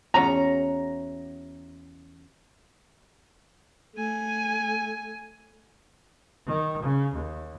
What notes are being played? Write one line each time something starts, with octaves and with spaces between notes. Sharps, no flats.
E2 C#4 F#4 A#5
A3 G#5
D#3
C#3
D#2